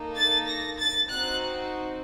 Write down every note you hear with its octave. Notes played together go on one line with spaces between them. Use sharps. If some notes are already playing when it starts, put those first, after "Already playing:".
Already playing: A#3 D#4 A4
A6
A#6
A6
C4 D#4 F#4 F#6